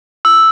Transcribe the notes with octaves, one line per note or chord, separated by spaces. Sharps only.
E6